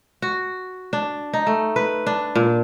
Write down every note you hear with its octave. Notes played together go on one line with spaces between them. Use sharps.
F#4
D4
D#4
A3
B4
D4
A#2